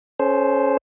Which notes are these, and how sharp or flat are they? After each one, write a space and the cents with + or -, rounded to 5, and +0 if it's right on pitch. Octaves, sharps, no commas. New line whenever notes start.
C#4 +0 A4 -45 C5 +0